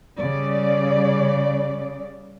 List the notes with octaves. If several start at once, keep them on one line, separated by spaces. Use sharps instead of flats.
C#3 G3 D5